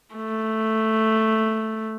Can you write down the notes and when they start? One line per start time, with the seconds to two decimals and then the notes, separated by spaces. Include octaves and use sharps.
0.16 A3